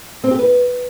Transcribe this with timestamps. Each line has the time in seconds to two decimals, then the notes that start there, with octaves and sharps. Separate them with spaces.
0.24 C4
0.31 G4
0.39 B4